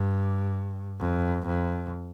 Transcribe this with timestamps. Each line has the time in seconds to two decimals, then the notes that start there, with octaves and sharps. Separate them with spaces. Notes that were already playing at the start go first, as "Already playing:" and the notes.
Already playing: G2
1.00 F2
1.47 F2